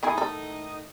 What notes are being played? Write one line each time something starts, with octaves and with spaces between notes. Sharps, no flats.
A2 D#3 B3 D#4 E4 G#4
A4